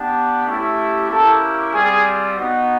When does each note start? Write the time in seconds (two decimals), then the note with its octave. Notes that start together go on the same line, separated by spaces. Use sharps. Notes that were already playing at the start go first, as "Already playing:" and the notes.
Already playing: B3 D4 G4
0.47 A3 C#4 E4 G4
1.10 A#3 C#4 E4 G4 A4
1.73 G3 C4 F4 G#4
2.36 B3 D#4 F#4